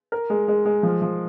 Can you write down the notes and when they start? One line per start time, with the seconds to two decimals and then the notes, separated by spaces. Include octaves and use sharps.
0.12 A#4
0.30 G#3
0.48 G#3
0.65 G#3
0.83 F3
1.02 F3